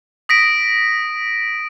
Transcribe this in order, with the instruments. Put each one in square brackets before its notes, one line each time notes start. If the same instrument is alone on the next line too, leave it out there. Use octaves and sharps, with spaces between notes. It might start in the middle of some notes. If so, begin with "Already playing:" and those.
[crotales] D#6 A#6 B6 D7